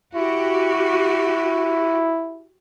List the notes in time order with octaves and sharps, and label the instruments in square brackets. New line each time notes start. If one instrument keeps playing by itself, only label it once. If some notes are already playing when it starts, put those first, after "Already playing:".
[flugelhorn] E4 [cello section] F#4 G4